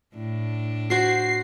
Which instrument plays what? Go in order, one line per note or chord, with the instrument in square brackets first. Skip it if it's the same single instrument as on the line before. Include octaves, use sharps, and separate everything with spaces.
[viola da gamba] A2 D4
[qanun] F#4 C5 [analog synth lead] C7